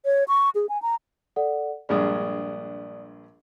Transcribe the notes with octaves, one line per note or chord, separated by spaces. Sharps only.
C#5
C#6
G#4
G#5
A#5
A4 D5 F#5
A#1 G2 G#3 D5 D#6